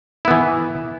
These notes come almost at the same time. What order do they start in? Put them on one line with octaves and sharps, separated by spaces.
E4 B3 E3